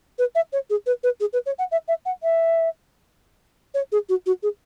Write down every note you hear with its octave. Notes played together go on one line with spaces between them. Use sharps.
B4
E5
C#5
G#4
B4
B4
G#4
B4
C#5
F#5
E5
E5
F#5
E5
C#5
G#4
F#4
F#4
G#4